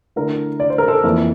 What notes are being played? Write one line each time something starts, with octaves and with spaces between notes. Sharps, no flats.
D3 A3 E4 A#4
D5
C5
A#4
A4 C5
F2 E3 A#3 E4